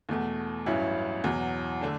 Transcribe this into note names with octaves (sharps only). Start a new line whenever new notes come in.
E2 B2 A3
A1 G2 F#3 C#4 E4
E2 B2 F#3
D3 A3 D4